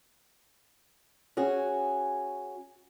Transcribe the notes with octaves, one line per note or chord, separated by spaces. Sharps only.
C#4 F#4 G#4